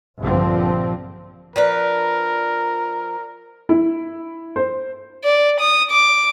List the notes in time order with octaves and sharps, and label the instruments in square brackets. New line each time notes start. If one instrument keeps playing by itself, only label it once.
[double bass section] A#1 G2 D3 F3 C4
[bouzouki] F3 D4 B4 [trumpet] A#4
[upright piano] E4
C5
[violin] D5
D#6
D6